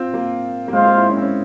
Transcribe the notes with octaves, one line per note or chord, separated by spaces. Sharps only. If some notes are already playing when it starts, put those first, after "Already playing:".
Already playing: C4 F4
A#3
A#3
G#3 F4 C5 F5
C4
A#3
E4
C#4
C4
C#4